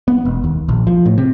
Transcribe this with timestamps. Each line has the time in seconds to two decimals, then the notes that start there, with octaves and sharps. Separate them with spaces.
0.08 B3
0.25 E1
0.44 D#2
0.69 A#1
0.87 F3
1.06 A2
1.18 C3